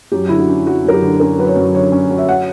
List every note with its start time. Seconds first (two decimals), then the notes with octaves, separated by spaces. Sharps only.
0.12 F#2 G4
0.29 D3 E4
0.39 F#4
0.49 C#4
0.66 F#3 F#4
0.85 F#2 A#4
0.93 G4
1.02 D3
1.20 C#4 A#4
1.38 F#3 B4
1.47 C#5
1.56 F#2
1.75 D3 C#5
1.92 C#4
2.10 F#3
2.18 E5
2.29 F#5